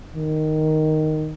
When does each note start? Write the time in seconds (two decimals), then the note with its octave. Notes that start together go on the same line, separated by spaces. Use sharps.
0.15 D#3